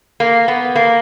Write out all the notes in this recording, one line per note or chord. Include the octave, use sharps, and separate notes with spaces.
A#3
B3
A#3